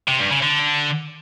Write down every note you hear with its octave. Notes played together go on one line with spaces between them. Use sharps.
C3
G2
C#3
D3